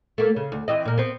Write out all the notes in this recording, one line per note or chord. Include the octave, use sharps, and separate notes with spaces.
A3 A#3
C#3
D2
E3 C4 D#5
A#2 A#3
B3 C4